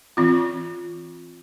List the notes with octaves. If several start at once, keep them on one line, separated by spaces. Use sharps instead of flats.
E3 C4 F4